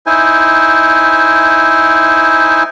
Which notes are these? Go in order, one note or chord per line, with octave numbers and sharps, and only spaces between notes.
D#4 E4 C5 G#5